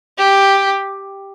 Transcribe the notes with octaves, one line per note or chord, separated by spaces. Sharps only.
G4